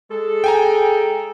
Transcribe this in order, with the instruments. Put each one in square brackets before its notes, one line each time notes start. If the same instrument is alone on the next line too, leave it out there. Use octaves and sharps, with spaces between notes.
[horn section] G#3 G#4 A4
[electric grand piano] G5 G#5 A#5